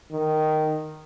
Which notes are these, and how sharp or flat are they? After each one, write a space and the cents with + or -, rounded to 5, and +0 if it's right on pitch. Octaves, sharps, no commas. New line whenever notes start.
D#3 -5